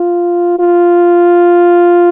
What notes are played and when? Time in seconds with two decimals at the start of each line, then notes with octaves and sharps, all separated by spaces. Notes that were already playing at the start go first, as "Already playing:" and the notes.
Already playing: F4
0.60 F4